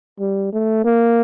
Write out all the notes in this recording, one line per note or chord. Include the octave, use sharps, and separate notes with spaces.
G3
A3
A#3